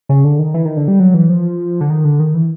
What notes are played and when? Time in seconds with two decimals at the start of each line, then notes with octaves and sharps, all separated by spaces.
0.09 C#3
0.24 D3
0.39 D#3
0.54 E3
0.65 D#3
0.77 D3
0.88 G3
1.00 F#3
1.14 E3
1.30 F3
1.81 D3
1.90 D#3
2.05 D3
2.20 D#3
2.34 E3